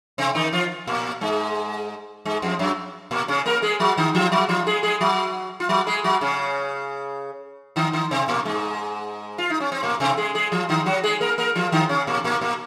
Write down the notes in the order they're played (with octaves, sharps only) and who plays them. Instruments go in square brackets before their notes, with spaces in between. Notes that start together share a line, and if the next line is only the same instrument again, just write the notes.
[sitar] C3 C4
D#3 D#4
F3 F4
A#2 A#3
G#2 G#3
G#2 G#3
F2 F3
F#2 F#3
A#2 A#3
C#3 C#4
A#3 A#4
G#3 G#4
F#3 F#4
D#3 D#4
F3 F4
F#3 F#4
F3 F4
G#3 G#4
G#3 G#4
F#3 F#4
F4
F#3 F#4
G#3 G#4
F#3 F#4
C#3 C#4
D#3 D#4
D#3 D#4
C3 C4
A#2 A#3
G#2 G#3
F4
D#4
C#4
C4
A#2 A#3
C3 C4
G#3 G#4
G#3 G#4
F3 F4
D#3 D#4
F#3 F#4
G#3 G#4
A#3 A#4
A#3 A#4
F3 F4
D#3 D#4
C#3 C#4
A#2 A#3
A#2 A#3
A#2 A#3